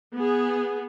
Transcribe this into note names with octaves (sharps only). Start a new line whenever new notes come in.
B3 G#4